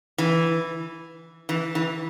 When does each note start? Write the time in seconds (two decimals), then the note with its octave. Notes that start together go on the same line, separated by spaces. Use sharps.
0.18 E3
1.49 E3
1.75 E3